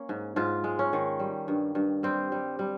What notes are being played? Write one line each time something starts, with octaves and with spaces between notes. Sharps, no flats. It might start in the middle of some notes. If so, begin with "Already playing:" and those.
Already playing: A#3 C#4
G#2
G#2 F4
G#3
C#4
D#3
G3
G2
G2
G3 C4
G3
G3